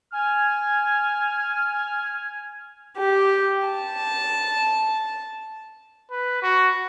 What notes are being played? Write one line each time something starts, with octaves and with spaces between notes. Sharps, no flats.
G#5 F6
G4
A5
B4
F#4